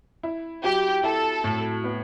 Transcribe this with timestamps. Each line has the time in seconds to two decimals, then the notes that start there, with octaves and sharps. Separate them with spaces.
0.23 E4
0.63 F#3 G4
1.03 E4 A4
1.44 A2
1.84 B3